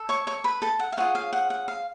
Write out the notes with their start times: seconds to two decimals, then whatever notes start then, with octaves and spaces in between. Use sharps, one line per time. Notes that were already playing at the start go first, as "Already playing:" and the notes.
Already playing: A4
0.09 C#5 C#6
0.27 C#5 C#6
0.44 B4 B5
0.62 A4 A5
0.79 F#5
0.92 F5
0.97 F4 G#4 C#5 F#5
1.15 F5
1.33 F#5
1.50 F#5
1.68 F5